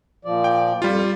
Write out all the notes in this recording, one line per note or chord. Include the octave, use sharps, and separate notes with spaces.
A#2 F3 D5
G5
F2 G3 F4